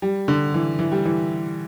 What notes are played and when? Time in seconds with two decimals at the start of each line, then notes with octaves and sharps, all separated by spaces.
0.02 G3
0.28 D3
0.54 E3
0.79 E3
0.92 G3
1.05 E3